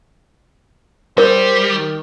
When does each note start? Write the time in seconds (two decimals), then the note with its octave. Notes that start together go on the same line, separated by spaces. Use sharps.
1.18 G3 A#4 C5
1.70 D#3